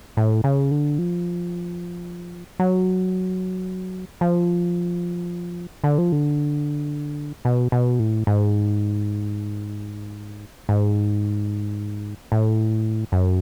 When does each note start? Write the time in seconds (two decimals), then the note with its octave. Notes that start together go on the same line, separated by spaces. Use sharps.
0.17 A2
0.44 C#3
0.71 D3
0.98 F3
2.59 F#3
4.21 F3
5.84 D3
5.98 F3
6.12 D3
7.45 B2
7.72 B2
7.99 A2
8.27 G#2
10.69 G#2
12.32 A2
13.12 F#2